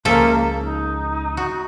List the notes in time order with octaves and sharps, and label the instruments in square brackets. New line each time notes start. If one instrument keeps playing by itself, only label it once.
[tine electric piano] C#2 C#3 G#3 [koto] F3 A4 E5 [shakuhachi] A#3
[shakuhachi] D#4
[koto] F#4